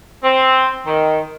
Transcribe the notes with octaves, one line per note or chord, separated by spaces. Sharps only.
C4
D#3